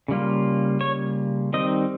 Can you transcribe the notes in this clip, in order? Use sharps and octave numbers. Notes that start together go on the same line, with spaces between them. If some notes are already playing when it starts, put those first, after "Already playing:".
C#3 G3 A#3 F4
C#5
D#3 G3 C4 D#4 D#5